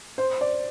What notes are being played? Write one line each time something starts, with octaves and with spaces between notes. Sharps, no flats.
C5
D5